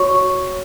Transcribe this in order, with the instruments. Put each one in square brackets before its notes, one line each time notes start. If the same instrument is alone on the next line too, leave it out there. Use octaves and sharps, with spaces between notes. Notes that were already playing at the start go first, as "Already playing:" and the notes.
Already playing: [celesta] F#4 C#5 C#6